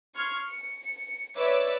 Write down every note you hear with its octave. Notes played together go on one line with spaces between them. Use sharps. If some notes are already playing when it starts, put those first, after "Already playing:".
C6 C#6 F6 G#6
C#7
C#7
B4 C#5 D5 E5 D6 E6